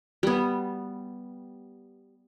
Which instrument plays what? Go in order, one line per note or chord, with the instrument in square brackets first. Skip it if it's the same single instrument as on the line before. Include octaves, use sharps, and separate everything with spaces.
[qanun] G3 B3